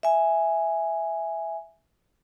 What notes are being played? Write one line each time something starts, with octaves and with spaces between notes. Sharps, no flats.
E5 G#5